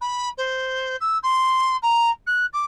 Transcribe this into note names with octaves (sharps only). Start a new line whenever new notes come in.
B5
C5
E6
C6
A#5
F#6
D6